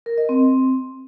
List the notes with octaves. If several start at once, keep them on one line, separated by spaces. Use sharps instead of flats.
A#4
D#5
C4